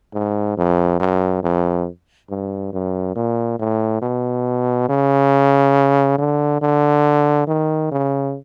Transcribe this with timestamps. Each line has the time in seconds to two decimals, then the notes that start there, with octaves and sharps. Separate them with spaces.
0.14 G#2
0.57 F2
1.00 F#2
1.43 F2
2.30 G2
2.73 F#2
3.16 A#2
3.59 A2
4.02 B2
4.89 C#3
6.18 D3
6.62 D3
7.47 D#3
7.92 C#3